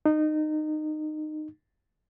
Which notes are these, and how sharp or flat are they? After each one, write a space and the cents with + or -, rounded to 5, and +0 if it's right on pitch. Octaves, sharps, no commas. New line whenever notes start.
D#4 -20